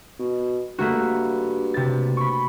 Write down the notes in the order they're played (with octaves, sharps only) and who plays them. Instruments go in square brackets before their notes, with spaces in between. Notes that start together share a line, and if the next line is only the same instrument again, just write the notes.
[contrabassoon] B2
[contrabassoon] G2 [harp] A3 A#3 F#4
[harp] C3 A6
B5 C#6